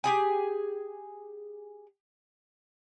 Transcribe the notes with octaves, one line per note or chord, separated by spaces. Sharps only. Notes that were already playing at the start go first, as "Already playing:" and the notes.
G4 G#4 G#5